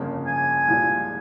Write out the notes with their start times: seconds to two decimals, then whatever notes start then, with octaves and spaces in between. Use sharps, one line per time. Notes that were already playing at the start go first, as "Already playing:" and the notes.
Already playing: G1 F2 C#3 F3 A#3
0.27 G#5
0.68 C2 A#2 F3 G#3